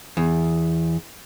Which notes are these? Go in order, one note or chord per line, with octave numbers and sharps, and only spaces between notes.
E2